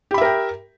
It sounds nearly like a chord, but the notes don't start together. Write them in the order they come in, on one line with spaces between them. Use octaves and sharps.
G4 B5 E5 A#4 G5